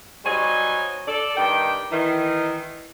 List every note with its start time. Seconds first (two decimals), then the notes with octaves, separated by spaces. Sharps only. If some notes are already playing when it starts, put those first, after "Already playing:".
0.25 F#3 G3 D#4 C5 C#5 G#5
1.08 A4 D5
1.37 G2 D#3 D5 G5
1.92 D#3 E3